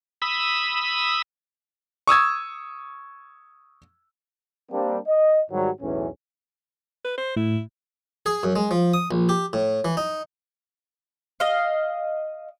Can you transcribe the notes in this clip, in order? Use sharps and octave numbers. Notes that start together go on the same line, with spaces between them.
B5 D#6 E6
C#6 D#6 E6 G#6
G3 A#3 C4 D4
D#5
G#2 D#3 F#3 G3
B1 E2 A2 E3 C#4
B4
C5
A2 E4
G#4
F#2
G#3
F3
D#6
A#1
G4
A2
E3
D#4
D#5 F5